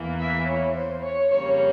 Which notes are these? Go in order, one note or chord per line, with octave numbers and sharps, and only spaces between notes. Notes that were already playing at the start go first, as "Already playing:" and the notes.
Already playing: E2 E3 A#3
E5
C#5
C5
C#5
F2 C#3 G3 A#3 C#5